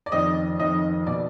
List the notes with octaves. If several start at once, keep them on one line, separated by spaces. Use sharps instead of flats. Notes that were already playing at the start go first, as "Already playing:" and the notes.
D5
F2 D#3 D#5
F2 D#3 D#5
B2 D5